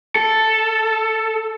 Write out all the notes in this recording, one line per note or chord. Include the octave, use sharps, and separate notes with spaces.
A4